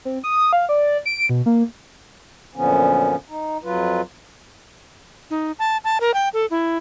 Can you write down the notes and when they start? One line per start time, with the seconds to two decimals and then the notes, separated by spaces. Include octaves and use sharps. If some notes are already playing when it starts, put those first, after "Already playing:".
0.05 C4
0.24 D#6
0.53 F5
0.69 D5
1.06 D7
1.29 B2
1.46 A#3
2.56 F#2 A#2 D3 F3 B3 C#4
3.29 D#4
3.64 F2 F#3 F4 B4
5.30 D#4
5.59 A5
5.84 A5
6.00 A#4
6.14 G5
6.33 A4
6.50 E4